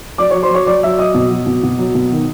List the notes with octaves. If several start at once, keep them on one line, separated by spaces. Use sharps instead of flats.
F#3 D5 D6
F#3 C#5 C#6
C5 C6
F#3 C#5 C#6
F#3 D5 D6
F#3 E5 E6
F#3 D#5 D#6
B2
F#3
B2
B2
F#3
B2
D#3